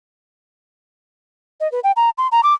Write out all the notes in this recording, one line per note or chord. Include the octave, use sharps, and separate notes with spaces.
D#5
B4
G5
A#5
C6
A#5
D6